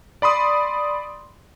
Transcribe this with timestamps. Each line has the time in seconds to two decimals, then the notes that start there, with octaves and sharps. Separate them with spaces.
0.22 D5 B5 C6 D#6